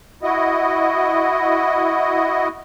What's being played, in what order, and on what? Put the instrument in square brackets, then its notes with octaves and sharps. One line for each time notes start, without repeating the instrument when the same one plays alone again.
[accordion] E4 F#4 D#5